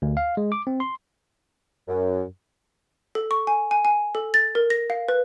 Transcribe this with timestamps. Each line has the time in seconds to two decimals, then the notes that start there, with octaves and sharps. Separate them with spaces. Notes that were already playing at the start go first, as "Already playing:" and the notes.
0.02 D2
0.17 F5
0.37 G#3
0.52 D6
0.67 C4
0.80 C6
1.87 F#2
3.15 A4
3.31 C#6
3.47 G#5
3.71 G#5
3.85 G#5
4.15 A4
4.34 A6
4.55 A#4
4.70 A#6
4.90 F5
5.09 B4